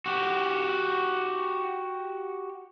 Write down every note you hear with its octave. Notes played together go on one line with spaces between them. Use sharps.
F#4 G4